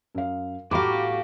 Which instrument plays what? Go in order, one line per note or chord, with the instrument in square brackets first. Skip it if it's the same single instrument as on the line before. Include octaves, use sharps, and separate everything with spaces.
[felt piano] F#2 F5
[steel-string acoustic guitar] A2 F5 [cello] F#4 G4 [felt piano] A#5 B5 D6